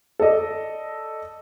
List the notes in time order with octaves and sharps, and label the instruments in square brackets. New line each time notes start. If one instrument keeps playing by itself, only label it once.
[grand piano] A4 D5 D#5